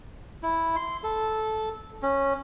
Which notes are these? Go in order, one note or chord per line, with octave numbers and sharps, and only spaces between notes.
E4
C6
A4
C#4